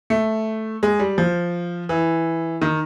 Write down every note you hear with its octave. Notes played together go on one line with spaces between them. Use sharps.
A3
G#3
G3
F3
E3
D#3